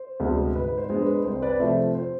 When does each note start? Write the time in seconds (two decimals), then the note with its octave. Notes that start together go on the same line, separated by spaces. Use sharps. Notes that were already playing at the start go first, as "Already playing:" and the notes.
Already playing: C5
0.20 D2 C3 G#3 B3
0.54 G#2 B4
0.78 C5
0.89 G#3 B3 D4
1.02 B4
1.24 C2 C5
1.42 B4 D5
1.60 C3 F3 A3 C5 E5
1.95 C5